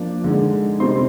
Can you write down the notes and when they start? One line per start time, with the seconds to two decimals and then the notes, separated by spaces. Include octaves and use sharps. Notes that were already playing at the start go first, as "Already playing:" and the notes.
Already playing: F3 A#3 D4
0.24 D3 G#3 D#4
0.80 C3 G3 C4 D#4 C6